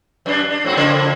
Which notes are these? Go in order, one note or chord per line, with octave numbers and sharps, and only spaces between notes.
F#2 D4
D4
G#2 C4 F#4
C#3 F3 A#3